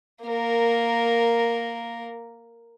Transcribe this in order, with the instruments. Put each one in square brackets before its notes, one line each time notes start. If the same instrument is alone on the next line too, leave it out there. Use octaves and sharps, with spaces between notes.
[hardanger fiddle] A#3 A#4